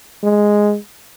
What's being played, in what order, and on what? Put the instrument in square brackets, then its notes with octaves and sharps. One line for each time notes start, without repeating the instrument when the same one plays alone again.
[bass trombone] G#3